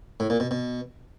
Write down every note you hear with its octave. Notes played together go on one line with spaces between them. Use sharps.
A2
A#2
B2
B2